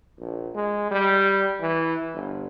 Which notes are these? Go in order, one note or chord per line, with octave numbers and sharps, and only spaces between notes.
A#1
G#3
G3
E3
G1